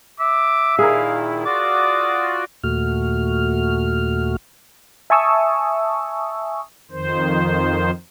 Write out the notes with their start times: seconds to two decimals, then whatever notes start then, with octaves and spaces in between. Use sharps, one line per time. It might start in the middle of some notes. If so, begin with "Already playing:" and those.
0.20 E5 D6
0.79 A#2 D#3 E4 G#4 A#4 F5
1.46 F4 F#4 D5 D6 D#6
2.64 D#2 A#2 A3 F#4 F6
5.10 E5 G#5 A5 C#6 D#6 E6
6.91 F2 D#3 C5